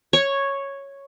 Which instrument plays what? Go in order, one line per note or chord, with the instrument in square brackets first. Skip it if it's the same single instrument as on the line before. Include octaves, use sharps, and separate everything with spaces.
[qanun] C#5